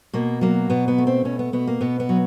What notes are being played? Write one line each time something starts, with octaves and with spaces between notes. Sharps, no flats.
B2 A#3
F#3 A#3
B2 B3
B3
A3
C4
B2 C#4
B3
B2 B3
A#3
B2 B3
B3
F#3